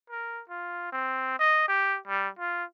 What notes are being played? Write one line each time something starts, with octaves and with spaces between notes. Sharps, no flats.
A#4
F4
C4
D#5
G4
G3
F4